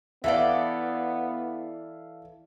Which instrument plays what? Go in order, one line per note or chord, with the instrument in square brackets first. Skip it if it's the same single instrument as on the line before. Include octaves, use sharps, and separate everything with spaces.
[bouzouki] E3 A4 D5 [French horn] B3 [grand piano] E5 F5